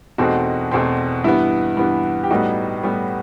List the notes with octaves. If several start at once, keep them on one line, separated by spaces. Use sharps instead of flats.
E2 B2 A3 C4 D#4 F#4
E2 B2 A3 C4
G2 E3 B3 E4
G2 E3 B3
G4
A2 G3 B3 D#4 F#4
A2 G3 B3